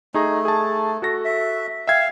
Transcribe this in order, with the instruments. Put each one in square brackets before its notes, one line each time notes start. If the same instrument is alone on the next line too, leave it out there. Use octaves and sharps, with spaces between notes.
[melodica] A3 [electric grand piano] D#4 G#4 A#5
[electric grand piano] G#4 A5
F#4 A4 A#6
[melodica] E5
[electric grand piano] E5 G5 G#6 [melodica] F5